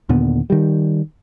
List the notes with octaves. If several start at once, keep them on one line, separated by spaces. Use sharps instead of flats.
D#2 A#2 D3 B3
D#3 G3